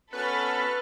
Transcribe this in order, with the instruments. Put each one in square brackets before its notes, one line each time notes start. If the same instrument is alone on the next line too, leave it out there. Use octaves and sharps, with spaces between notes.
[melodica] B3 C#4 F#4 [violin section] A4 B5 [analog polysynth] B4 C#6 F6